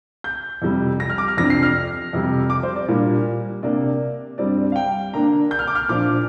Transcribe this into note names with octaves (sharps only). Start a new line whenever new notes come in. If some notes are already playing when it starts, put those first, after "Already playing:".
G6
F2 C3 G3
A#6
F6
D6
F6
F2 C3 F3 D4 A#6
C7
F6
F2 C3 G3
D6
C5
D5
A#2 G3 A#3 D4
C3 A#3 D4 D5
G2 G3 C4 D5
F5
G5
D3 A#3 D4 A#5
G6
F6
D6
F6
A#2 F3 D4 D6